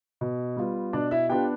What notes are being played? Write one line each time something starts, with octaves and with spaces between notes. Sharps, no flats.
B2
G3 B3 F4
B2 D4 D5
E4 E5
B3 D4 F4 G4 G5